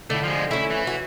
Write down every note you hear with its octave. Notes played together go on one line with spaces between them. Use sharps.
D3 A3 E4
F3 G#3
A3 C#4 E4
E3
F#4